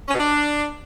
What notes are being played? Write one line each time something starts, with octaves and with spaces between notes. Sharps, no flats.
C#4
B2
D4